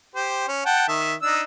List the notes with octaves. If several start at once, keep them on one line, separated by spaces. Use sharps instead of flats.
G4 C5
C#4
F#5 G5 A5
D#3 E5
D4 D#4 E6